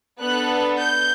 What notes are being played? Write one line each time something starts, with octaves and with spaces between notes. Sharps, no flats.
B3 D4 A4 F#6
G6